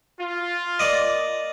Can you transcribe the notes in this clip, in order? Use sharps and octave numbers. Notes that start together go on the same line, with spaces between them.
F4
A#3 D5 D#5